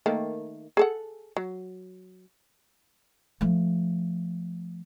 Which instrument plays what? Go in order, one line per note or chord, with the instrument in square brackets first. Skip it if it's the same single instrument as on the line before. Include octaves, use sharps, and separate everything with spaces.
[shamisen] D#3 A3 A#3
G#4 A4 F#5
F#3
[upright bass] F3 A3